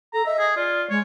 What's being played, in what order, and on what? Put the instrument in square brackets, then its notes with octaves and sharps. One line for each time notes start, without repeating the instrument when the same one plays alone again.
[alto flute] A4 [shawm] A#5
[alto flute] D#5 [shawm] E5
[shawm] G#4
[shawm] F4 [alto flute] D5
[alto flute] G#3 [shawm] C#5